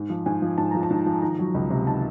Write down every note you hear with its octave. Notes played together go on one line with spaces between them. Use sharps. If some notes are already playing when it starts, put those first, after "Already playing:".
Already playing: G#2
F3
G#2 G#5
F3
G#2 A5
F3 A#5
A5
G#2
F3
D#3 A#5
F#3
C#2
C3
D#3 A5